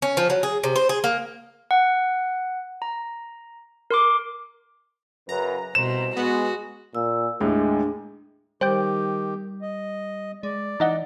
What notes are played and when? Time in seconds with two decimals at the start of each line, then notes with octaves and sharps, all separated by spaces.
0.02 C#4
0.17 F3
0.30 F#3
0.43 G#4
0.64 C3
0.76 C5
0.89 G#4
1.04 A#3
1.71 F#5
2.82 A#5
3.91 A#4 C6 D6
5.29 F#2 C#3 B4 A#5
5.75 C2 B2 C5 E7
6.17 G#3 B3 F#4
6.95 A#2 E6
7.41 D#2 A2 G#3 D4
8.61 D#3 G3 G4 C5 G5 G6
9.62 D#5
10.43 G#3 D5
10.80 E3 D#4 D#5 F#5